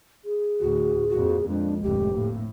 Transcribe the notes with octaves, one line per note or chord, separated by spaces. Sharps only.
G#4
D2 A2 F#4
F2 A#2 F#4
F2 G#3 D4
F1 D2 A2 G4
A2 A#3